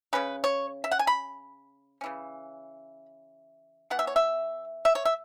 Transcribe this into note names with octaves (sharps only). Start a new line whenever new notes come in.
C#3 F#3 C#4 B4
C#5
E5
F#5
G#5
B5
C#3 E3 C#4
E3 B3 F#5
E5
C#5
E5
E5
C#5
E5